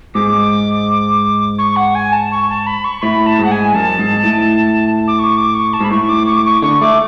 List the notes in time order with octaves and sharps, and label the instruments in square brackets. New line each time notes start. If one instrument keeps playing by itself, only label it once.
[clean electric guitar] G#2 [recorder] D6
[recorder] C#6
F#5
G#5
A5
C#6
A5
B5
C#6
[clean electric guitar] A2 [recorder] B5
[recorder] A5
[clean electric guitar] G#2
[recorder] F#5
G#5
[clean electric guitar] F#2 [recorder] A5
[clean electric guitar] G#2
A2
[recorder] D6
C#6
D6
C#6
A5
[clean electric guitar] G#2 [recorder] B5
[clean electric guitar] A2 [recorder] C#6
[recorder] D6
C#6
D6
C#6
[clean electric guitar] D3 [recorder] C#6
[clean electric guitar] A3 [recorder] D6